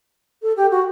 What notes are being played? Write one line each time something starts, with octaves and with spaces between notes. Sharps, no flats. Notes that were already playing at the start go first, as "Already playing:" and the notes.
A4
G4
F#4